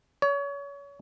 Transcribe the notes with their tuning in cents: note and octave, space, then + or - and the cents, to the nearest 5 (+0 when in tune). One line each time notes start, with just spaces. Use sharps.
C#5 +30